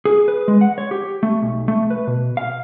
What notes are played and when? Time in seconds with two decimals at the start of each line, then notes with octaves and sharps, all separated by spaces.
0.05 G#4
0.28 B4
0.48 G#3
0.61 F#5
0.78 C#5
0.91 G4
1.23 A3
1.42 B1
1.68 A3
1.90 B4
2.07 B2
2.37 F5